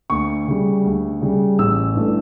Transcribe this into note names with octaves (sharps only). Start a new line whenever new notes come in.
D2 C#6
C#3 G3
D2
C#3 G3
A1 E6
G2 E3 A3 D4